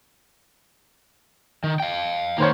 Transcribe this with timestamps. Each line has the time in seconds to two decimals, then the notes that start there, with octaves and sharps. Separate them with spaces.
1.64 D#3
1.80 F5 G5
2.38 D#3 A#3 B3 C5 C#5